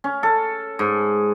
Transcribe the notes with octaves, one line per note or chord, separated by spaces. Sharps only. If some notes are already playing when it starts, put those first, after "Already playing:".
C#4
A4
G#2